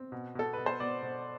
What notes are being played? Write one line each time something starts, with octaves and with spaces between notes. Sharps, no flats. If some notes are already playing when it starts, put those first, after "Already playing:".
Already playing: C4
B2
B2 A4
B2 B4
C5
B2 D5
B2